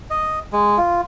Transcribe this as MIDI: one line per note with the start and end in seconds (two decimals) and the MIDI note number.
0.10 0.39 75
0.53 0.78 56
0.78 1.01 65